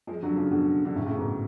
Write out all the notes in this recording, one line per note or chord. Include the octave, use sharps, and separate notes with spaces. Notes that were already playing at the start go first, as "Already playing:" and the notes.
F3 G#3
D3 F#3
C#3 F3
B2 D3
D3
A2 C#3
A2 C#3
G#2 B2